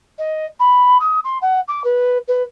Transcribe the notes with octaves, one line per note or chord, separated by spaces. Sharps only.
D#5
B5
D#6
C6
F#5
D6
B4
B4